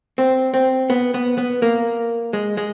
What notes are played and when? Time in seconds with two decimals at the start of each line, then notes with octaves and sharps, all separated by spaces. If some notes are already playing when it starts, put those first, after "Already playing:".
0.18 C4
0.54 C4
0.90 B3
1.14 B3
1.38 B3
1.62 A#3
2.33 G#3
2.57 G#3